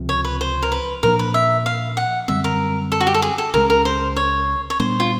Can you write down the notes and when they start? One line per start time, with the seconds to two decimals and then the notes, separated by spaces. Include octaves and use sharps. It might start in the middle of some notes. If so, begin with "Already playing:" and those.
Already playing: C#2 C3 F3
0.09 C#5
0.25 B4
0.41 C5
0.62 A#4
0.72 B4
1.03 A#2 F3 A#3 D4 A#4
1.19 B4
1.34 E5
1.66 F5
1.97 F#5
2.28 F#2 D3 G3 C4 E5
2.44 A#4
2.92 A4
3.00 F#4
3.07 G4
3.14 A4
3.22 G#4
3.38 A4
3.54 C#2 C#3 E3 G#3 A#4
3.70 A#4
3.85 C5
4.16 C#5
4.70 C#5
4.79 A#2 G3 B3 D4 C5
5.00 F4